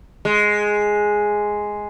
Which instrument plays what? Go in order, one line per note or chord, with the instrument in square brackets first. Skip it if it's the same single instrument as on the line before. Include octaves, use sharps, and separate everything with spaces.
[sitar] G#3